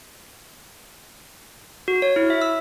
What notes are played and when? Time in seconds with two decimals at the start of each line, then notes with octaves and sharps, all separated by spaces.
1.88 F#4
2.02 C#5
2.16 E4
2.30 E5
2.42 E6